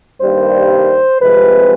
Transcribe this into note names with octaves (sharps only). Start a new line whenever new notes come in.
G2 D#3 G3 A#3 C5
C2 C3 F3 G#3 B4